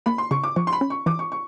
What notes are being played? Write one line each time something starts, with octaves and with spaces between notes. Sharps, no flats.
A#3 B5
C6
C#3 C#6
D6
F3 C#6
C6
B5
C#4
C#6
E3 D6
C#6
C#6